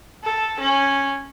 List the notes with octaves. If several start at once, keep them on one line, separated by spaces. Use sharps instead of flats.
A4
C#4